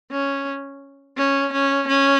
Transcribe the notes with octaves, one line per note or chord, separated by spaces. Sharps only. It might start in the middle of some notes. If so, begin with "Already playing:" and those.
C#4
C#4
C#4
C#4